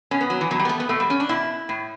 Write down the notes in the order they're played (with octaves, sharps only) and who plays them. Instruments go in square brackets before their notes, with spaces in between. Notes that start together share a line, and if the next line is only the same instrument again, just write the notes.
[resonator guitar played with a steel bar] B2 C#4
B3
F#3
E3
B2 F#3
G3
B3
A3
B3
B2 A3
G3
C#4
D4
B2 E4
A2